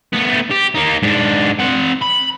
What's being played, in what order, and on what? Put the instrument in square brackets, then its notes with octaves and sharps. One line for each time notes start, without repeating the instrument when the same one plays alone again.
[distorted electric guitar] A3 B3
G4
A#3 D#4
G#2 D4
C4 F#5
B5